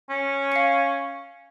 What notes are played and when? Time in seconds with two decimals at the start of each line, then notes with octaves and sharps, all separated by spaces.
0.10 C#4
0.52 F5 C#7